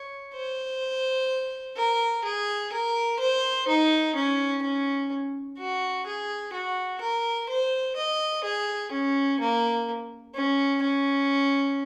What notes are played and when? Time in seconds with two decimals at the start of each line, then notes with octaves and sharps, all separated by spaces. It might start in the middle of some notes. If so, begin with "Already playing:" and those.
Already playing: C#5
0.34 C5
1.77 A#4
2.24 G#4
2.73 A#4
3.19 C5
3.68 D#4
4.15 C#4
4.62 C#4
5.59 F#4
6.06 G#4
6.53 F#4
7.01 A#4
7.50 C5
7.97 D#5
8.44 G#4
8.92 C#4
9.40 A#3
10.35 C#4
10.82 C#4